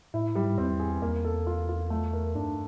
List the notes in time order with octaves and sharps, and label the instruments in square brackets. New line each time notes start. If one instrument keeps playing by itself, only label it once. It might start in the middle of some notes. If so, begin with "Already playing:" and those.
[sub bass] A2 [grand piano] E4
[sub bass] G#2 [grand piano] G3
[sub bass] E2 [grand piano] C4
[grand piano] G#4
[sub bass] E2 [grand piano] A#3
[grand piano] A4
F4
F4
A3
A#4
[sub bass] G2 [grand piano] D4